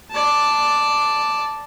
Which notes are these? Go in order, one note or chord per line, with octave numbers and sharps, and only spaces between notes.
D5 A5